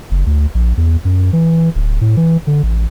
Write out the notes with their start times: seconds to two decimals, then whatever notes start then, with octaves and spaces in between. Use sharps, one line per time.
0.11 F#1
0.26 D2
0.55 A#1
0.77 E2
1.05 F#2
1.33 E3
1.75 D1
2.01 A2
2.17 E3
2.47 D3
2.63 A1